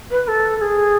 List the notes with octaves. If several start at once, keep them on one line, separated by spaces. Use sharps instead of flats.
B4
B4
A4
A4
G#4